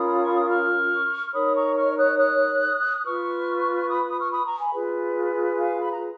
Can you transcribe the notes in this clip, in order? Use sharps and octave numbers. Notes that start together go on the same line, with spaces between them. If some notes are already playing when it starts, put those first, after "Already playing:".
Already playing: C#4 F4 A#4 B5 D#6
C#6
D#6
C#6 F6
F6
D#4 A#4 C#5 B5 D#6
A#5 C#6
C#6 F6
D#6 F#6
D#6 F#6
F4 B4 C#6 F6
B5 D#6
B5 D#6
C#6 F6
B5 D#6
A#5 C#6
G#5 B5
F4 G#4 B4
F5 G#5
B5
A#5